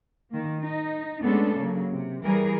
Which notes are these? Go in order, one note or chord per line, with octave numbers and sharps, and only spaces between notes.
D#3 A#3
D#4
G#3 A3 B3 C#4 D4 A4
C#3 F#3 A#3
C3
E3 G3 G#4 A#4